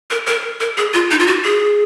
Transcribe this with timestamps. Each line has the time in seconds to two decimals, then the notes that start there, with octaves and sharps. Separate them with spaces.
0.10 A#4
0.27 A#4
0.60 A#4
0.78 G#4
0.94 F4
1.11 D#4
1.19 F4
1.27 F#4
1.44 G#4